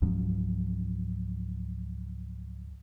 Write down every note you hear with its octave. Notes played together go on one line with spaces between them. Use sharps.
C#2 G#2 F3 F#3